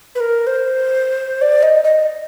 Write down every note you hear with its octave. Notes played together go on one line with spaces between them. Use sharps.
B4
A#4
C5
D5
D#5
D#5